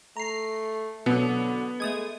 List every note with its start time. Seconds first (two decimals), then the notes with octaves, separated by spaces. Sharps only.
0.17 A3 A#5 C7
1.06 B2 D3 F#3 B3
1.80 G#3 A3 D#6 G#6